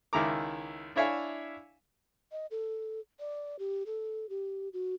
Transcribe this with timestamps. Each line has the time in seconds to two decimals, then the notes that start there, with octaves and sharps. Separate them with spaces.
0.13 C#2 D#3 E4 A#5 D6
0.96 D4 E4 C#5 E5 F5 G#5
2.32 D#5
2.51 A4
3.19 D5
3.59 G4
3.86 A4
4.29 G4
4.73 F#4